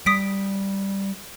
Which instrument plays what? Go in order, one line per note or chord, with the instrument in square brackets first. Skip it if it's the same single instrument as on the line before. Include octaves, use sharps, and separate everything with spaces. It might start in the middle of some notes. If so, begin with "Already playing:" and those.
[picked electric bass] G3 [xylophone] D#6 B6 D7